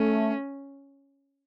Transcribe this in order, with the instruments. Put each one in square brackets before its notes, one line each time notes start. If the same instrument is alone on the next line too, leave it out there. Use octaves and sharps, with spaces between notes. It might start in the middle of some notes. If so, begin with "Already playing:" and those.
Already playing: [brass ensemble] A3 [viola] C#4